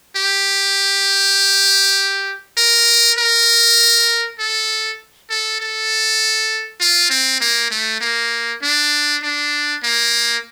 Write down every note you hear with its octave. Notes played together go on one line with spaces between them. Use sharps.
G4
A#4
A#4
A4
A4
A4
F4
C4
A#3
A3
A#3
D4
D4
A#3